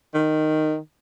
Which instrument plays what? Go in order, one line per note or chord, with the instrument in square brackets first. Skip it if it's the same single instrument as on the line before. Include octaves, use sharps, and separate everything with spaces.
[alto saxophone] D#3